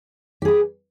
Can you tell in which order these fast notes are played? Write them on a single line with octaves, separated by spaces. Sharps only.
G4 G#4 B4